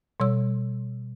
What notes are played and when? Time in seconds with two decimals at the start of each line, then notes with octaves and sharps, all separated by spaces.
0.20 B2 G3 C#5 E6